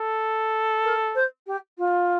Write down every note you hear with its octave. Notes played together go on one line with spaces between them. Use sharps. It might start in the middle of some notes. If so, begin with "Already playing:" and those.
Already playing: A4
A#4
C5
G4
F4